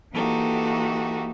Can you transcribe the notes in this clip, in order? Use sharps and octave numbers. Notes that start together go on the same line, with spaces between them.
E3 A#3 D#4 F#4 G4 A4